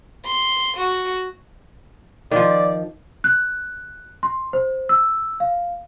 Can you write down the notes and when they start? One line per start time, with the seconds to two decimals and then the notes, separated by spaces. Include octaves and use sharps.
0.24 C6
0.76 F#4
2.31 D#3 F3 D5
3.24 F#6
4.23 C6
4.53 C5
4.89 E6
5.40 F5